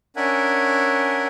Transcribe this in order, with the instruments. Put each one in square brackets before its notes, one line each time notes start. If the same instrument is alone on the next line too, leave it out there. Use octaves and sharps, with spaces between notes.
[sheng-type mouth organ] C#4 D4 A#4 E5 F#5 G#5